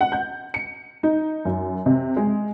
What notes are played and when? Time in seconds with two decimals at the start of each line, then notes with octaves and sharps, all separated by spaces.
0.01 F#5
0.12 G6
0.54 C#7
1.03 D#4
1.45 F#2
1.86 C3
2.16 G#3